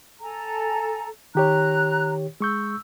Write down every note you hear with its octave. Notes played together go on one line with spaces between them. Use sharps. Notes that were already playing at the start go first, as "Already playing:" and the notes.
A4 G#5 A#5
D#3 G4 C#5 A#5 F#6
G#3 C#6 E6 G6